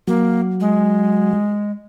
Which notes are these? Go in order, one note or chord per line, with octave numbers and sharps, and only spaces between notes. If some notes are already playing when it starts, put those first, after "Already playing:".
F#3 A#3
G#3